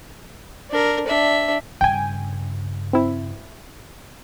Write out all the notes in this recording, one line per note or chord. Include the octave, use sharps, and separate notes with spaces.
D4 A#4
D4 E5
G2 C#3 G5 G#5
C4 E4